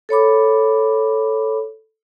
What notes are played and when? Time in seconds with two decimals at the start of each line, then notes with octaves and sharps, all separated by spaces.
0.09 A4 C#5 B5 D6